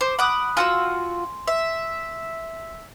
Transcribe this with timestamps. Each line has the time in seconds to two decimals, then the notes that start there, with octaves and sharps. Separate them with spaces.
0.01 C5 D6
0.19 F#5 B5 D6 D#6 F#6
0.57 F4 F#4 G#5 C6 E6
1.48 E5